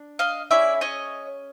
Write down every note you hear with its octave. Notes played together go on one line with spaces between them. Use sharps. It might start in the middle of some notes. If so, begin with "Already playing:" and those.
Already playing: D4
D#5 F5
C#4 E4 G#4 D5 E5
C#5 D#5